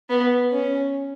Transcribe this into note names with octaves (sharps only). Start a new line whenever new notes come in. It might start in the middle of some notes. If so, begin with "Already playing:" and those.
B3
C#4